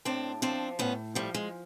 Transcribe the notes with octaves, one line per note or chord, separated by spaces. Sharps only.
A2 C4 D4
F3 C4 D4
A2 B3 C#4
F3 G3 A3
G#3